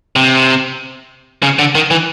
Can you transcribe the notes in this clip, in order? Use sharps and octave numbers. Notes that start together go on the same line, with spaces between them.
C3
C#3
D3
D#3
E3